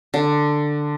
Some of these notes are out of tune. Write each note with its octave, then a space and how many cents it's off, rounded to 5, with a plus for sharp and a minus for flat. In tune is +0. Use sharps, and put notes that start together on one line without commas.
D3 +10